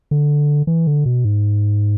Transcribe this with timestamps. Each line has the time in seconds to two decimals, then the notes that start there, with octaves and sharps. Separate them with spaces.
0.11 D3
0.67 E3
0.87 D3
1.06 B2
1.25 G#2